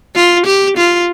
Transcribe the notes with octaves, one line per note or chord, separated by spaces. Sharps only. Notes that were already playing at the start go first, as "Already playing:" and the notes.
F4
G4
F4